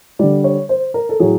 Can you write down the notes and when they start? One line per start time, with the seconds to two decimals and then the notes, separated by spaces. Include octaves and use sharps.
0.19 D3 G3 D5
0.44 C#5
0.69 C5
0.94 A#4
1.09 A4
1.20 A2 F#3 G#4